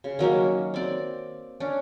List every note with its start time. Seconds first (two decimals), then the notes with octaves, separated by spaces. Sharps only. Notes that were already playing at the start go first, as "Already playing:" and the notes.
0.04 C#3
0.19 D#3 F#3 A#3 C#4
0.74 C4 D5
1.60 C#4 D4